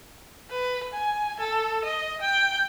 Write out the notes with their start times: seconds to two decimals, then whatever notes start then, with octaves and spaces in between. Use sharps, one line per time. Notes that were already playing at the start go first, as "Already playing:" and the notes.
0.51 B4
0.94 G#5
1.40 A4
1.85 D#5
2.22 G5